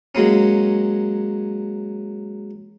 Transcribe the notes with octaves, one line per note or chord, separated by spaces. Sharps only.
F#3 G#3 A#3 C#4